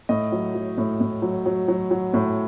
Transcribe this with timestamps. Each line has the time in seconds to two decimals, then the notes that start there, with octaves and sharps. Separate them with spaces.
0.09 A2 D#5
0.32 F#3
0.55 F#3
0.78 A2
1.01 A2
1.22 F#3
1.46 F#3
1.68 F#3
1.91 F#3
2.14 A2